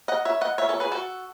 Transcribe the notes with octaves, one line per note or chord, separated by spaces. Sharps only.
D#5 F#5
C#5 E5
D#5 F#5
C#5 E5
A4 C#5
G#4 B4
F#4 A4